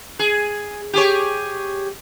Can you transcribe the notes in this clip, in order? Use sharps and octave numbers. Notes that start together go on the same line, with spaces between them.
G#4
G4 G#4 C#5